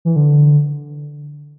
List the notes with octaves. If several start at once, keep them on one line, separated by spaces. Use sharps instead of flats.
E3
D3